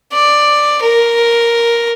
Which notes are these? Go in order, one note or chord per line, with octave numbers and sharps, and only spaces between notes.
D5
A#4